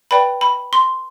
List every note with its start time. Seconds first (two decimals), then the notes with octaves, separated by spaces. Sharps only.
0.11 B4 D5 G5 B5
0.41 B5
0.73 C6